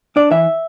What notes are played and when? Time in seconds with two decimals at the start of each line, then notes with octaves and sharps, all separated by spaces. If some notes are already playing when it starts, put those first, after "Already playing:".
0.16 D4 D5
0.31 E3 E5